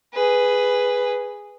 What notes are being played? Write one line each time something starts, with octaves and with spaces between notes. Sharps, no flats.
G#4 B4